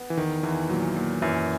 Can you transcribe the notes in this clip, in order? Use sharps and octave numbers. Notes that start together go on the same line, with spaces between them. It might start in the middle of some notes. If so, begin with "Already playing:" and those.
Already playing: B3
E3
E2 D#3
E2 E3
A#2 F#3
A#2
F#2 E3